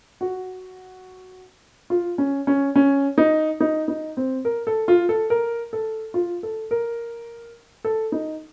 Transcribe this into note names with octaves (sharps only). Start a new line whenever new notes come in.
F#4
F4
C#4
C#4
C#4
D#4
D#4
D#4
C4
A#4
A4
F4
A4
A#4
A4
F4
A4
A#4
A4
D#4